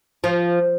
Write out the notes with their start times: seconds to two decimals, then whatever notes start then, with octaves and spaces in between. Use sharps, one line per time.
0.24 F3